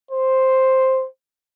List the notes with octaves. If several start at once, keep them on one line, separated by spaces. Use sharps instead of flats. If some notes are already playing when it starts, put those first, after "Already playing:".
C5